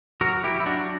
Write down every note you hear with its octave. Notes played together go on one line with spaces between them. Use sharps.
F#3 F#4 A#4
E4 G4
F#3 E4
D4 F#4